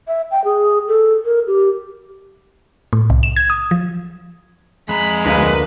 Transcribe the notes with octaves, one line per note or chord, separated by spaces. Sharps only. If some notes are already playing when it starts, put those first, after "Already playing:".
E5
G5
G#4
A4
A#4
G4
A2
C2
E7
G#6
D#6
F3
F2 G#3 A#5 B5 F#6
D2 A#3 B4